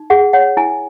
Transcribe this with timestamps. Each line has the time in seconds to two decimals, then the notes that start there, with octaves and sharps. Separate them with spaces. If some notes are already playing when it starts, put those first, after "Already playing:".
Already playing: D#4
0.10 G#4 F#5
0.33 C#5 F#5
0.57 E4 G#5